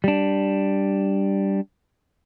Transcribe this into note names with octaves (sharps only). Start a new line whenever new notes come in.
G3 D4